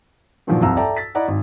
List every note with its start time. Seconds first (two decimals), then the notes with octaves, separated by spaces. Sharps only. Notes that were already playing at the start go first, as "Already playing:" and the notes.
0.47 G2 A#2 D#3 F3 F#3
0.62 C2 F2 F4 A#5 E6
0.77 A4 D5 E5 G5 A5 A#5
0.97 A6 B6
1.15 E4 D5 D#5 F#5 A#5
1.28 G#1